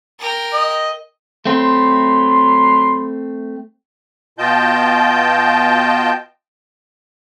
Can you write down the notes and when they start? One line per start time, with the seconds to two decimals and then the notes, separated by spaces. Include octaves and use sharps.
0.19 A#4 G5
0.54 D#5
1.46 F#3 A3 C4 B5 C6
4.39 B2 F4 D#5 G5 A5 G6